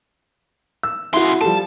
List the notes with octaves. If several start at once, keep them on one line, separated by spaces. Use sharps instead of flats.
E6
C#3 E4 F#4 C6
F3 G3 A4 A5